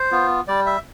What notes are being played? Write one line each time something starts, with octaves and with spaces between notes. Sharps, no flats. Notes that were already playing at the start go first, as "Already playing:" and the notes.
Already playing: C5
B3 F4
G3 D5
E5